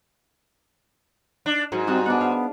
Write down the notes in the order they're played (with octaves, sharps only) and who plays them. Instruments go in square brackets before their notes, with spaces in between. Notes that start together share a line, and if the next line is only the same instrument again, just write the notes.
[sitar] D4
[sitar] G#2 [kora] F#3 A#4 C#5
[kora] G3 D#4 F#4 [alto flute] C4
[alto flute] B3 [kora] D4 D5 F#5
[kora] F5